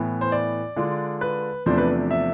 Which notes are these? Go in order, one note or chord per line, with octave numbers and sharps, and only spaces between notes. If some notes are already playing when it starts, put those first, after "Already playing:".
Already playing: A2 E3 B3
C5
D5
D3 G#3 D4 F4
B4
E2 C3 F3 A3 D4 C5
B4
E5